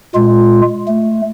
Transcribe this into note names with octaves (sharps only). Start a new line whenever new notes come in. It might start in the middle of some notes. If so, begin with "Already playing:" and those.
A#2 G#3 F4
A3